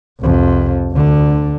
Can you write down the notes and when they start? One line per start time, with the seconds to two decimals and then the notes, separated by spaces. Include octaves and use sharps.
0.21 C2 F2
0.92 D2 D3